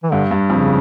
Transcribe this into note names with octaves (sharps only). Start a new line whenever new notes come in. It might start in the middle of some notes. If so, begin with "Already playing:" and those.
E3
G2 D3
G2
F2 C#3